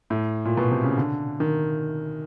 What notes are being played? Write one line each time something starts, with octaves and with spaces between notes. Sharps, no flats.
A2
A#2
B2
C3
C#3
D3
D#3